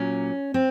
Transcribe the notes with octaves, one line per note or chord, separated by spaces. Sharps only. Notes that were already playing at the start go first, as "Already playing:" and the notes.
Already playing: A#2 F#3 A#3 C#4
C4